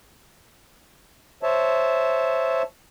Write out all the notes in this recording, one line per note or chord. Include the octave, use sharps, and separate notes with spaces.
C5 C#5 E5 A5